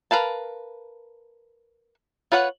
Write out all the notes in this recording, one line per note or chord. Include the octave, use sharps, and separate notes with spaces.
A#4 B4 F5 A5
F4 B4 C#5 F#5